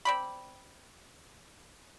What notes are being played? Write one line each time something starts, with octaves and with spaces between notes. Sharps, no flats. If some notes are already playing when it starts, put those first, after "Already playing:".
C4 D5 B5